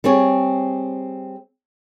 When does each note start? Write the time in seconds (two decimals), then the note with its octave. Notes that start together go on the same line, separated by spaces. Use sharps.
0.04 G3 C4 G#4 C#5